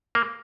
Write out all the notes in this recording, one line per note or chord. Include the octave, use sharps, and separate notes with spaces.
A#3